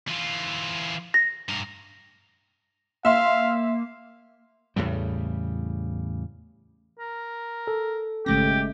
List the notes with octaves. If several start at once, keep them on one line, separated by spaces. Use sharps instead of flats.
E3 F4
A#6
G2 A#4
A#3 E5 F5 C6
E2 A2 C#3 G3
A#4
A4
G#1 C#3 G#3 A3 C#4 G4 A#6